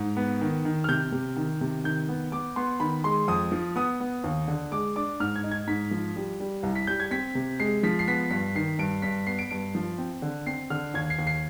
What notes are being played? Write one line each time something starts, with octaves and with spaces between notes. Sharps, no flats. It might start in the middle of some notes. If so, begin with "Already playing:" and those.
Already playing: G#2
B3
D#3
D#3
F6
C3 G6
C3
D#3
C3
D#3 G6
B3
B3 D6
B3 C6
D#3 B5
G#3 C6
F2 D#6
F3
B3 D#6
B3
D#2
D3
G#3 D6
D4 D6
G#2 F6
G#6
D#4
G#6
G#2 B6
F3
G3
G3
C2
B6
G3 G6
G#6
C4 B6
C3
G#3 C7
F3 B6
C7
B3 B6
G2 B6
D#3 C7
G2 D7
G2 B6
B3 C7
D7
G2 D7
F3
C4
D3
C4 C7
D3 F6
D#2 G#6
C7
D#2
C7